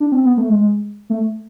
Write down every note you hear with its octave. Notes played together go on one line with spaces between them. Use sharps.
D4
C4
B3
A3
G#3
A3